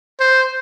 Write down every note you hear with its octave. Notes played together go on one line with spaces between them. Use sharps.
C5